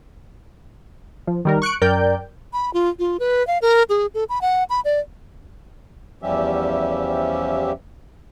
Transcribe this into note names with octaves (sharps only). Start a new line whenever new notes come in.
F3
D#3 G3 A#4
C#6 F#6 C#7 D7
F#2 A#4 D5 G5 G6
B5
F4
F4
B4
F5
A#4
G#4
A4
B5
F#5
B5
D5
E2 F3 G3 C#4 G4 E5